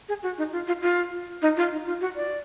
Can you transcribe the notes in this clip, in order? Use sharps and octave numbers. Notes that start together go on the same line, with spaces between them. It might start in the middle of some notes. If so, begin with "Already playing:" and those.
G#4
F#4
D#4
F4
F4
F4
D#4
F4
D#4
F4
F#4
D5